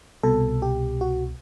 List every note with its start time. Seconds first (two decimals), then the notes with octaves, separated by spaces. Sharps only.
0.23 C2 B2 A4
0.62 G4
1.01 F#4